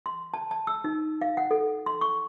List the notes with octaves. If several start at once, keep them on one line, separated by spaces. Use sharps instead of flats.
C6
A5
A5
E6
D#4
F5
F#5
A4
C6
C#6